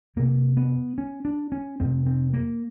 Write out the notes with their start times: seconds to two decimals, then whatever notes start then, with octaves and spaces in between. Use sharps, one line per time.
0.16 F2 C3 A#3
0.57 B3
0.98 C#4
1.25 D4
1.52 C#4
1.80 F2 C3 C4
2.07 C4
2.33 A#3